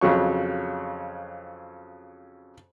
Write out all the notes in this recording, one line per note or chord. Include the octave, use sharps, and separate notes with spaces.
F2 C#3 F#3 C#6